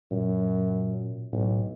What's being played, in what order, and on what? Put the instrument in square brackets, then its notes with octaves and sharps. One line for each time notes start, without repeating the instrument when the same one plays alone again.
[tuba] F#2 [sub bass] A#2
[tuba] B1 [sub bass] A2